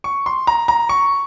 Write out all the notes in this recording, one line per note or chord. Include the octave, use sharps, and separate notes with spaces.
C#6
C6
A#5
A#5
C#6